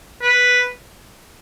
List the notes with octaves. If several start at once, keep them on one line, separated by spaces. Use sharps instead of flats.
B4